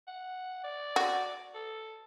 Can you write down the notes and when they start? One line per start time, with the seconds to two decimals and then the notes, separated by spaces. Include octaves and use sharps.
0.07 F#5
0.64 D5
0.96 F#4
1.54 A4